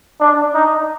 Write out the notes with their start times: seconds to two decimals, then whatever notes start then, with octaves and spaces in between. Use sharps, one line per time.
0.20 D4
0.54 D#4